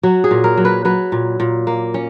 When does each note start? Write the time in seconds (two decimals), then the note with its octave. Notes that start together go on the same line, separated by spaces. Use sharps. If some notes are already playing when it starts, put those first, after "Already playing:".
0.03 F#3 F#4
0.24 G#4
0.31 A#2
0.44 A#4
0.57 F#3
0.65 B4
0.85 F#3 B4
1.12 A#2
1.40 A#2
1.67 A#3
1.94 C#4